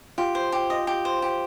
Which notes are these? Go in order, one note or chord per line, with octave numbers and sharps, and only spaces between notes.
F4 G4
C5
G4
D#5
G4
C5
G4